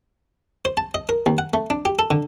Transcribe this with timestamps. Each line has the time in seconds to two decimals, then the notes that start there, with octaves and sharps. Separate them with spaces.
0.65 C5
0.77 A5
0.94 D#5
1.09 A#4
1.26 D#2
1.38 F#5
1.54 A3
1.70 D4
1.85 G4
1.99 A4
2.11 D3